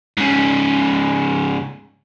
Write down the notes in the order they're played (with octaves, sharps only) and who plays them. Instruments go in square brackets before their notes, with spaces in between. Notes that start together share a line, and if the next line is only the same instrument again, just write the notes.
[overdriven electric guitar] G#2 C#3